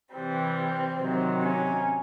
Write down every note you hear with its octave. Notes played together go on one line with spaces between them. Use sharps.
C3 E3 G3 C4
C3 D#3 F#3
C#4